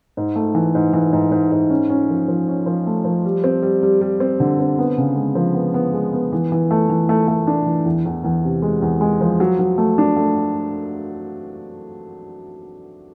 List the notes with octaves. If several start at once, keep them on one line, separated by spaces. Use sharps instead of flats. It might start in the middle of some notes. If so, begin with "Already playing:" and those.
G#2
A3
E3
G#2
E3
G#2
G#2
G#2
C#4
C#4
F3
F3
C#4
F3
A3
F3
G3
C4
G3
G3
G3
C4
D3
C4
B3
C#3
G#3
F3
B3
B3
G#3
B3
E3
E3
A3
E3
A3
A3
D4
E3
E2
E2
E2
C3
G#3
E2
G#3
F3
F#3
F#3
A3
D4
A3